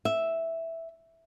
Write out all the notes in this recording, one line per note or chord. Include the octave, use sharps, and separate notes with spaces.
E5